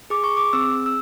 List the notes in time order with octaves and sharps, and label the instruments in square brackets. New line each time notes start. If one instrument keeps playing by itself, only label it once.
[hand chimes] G#4 D6
C#6
D6
C4 E6
E6